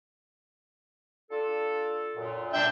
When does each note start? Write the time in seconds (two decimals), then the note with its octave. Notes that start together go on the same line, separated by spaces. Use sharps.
1.31 D4 F4 A4
2.15 F#2 A#2
2.53 D4 E5 G5